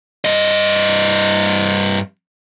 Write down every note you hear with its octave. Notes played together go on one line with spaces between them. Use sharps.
G2 D#5